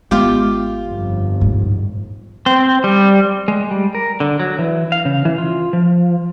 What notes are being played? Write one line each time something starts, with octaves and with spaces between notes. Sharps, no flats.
G#1 G#3 B3 F4 G4
G1 F2
A#1 G#2
C4
G3
G#3
G3
A#4
D3
F#3
E3
F5
C#3
E3
F4
F3